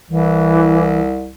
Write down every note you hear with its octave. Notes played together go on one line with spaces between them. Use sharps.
C2 E3